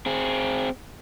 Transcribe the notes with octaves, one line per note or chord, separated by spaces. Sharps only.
C4 G#4